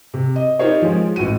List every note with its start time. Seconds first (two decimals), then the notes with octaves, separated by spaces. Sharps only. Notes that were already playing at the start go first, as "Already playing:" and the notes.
0.14 C3
0.36 D#5
0.59 D#4 F4 G4 A#4 C5 C#5
0.82 F3 G#3
1.16 A1 A2 F#4 D#7